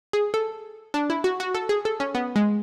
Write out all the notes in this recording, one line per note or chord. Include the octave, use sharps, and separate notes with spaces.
G#4
A4
D4
E4
F#4
F#4
A4
G#4
A4
C#4
B3
G#3